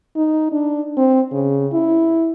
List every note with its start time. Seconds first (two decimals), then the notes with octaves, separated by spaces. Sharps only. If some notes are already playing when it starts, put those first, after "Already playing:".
0.16 D#4
0.52 D4
0.97 C4
1.32 C#3
1.73 E4